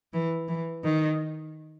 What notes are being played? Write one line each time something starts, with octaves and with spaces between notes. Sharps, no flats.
E3
E3
D#3